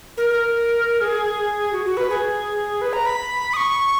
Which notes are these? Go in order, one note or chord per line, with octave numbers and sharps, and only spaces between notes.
A#4
A#4
G#4
F#4
F#4
B4
G#4
B4
A#5
B5
D#6
C#6